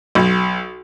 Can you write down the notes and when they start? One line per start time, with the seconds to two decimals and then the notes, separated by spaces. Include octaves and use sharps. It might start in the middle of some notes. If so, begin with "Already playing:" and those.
0.15 B1